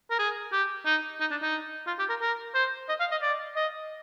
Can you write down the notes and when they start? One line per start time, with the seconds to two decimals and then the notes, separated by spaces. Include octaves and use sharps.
0.10 A#4
0.19 G#4
0.52 G4
0.86 D#4
1.20 D#4
1.31 D4
1.42 D#4
1.87 F4
1.99 G4
2.09 A#4
2.21 A#4
2.54 C5
2.89 D#5
3.00 F5
3.11 D#5
3.22 D5
3.56 D#5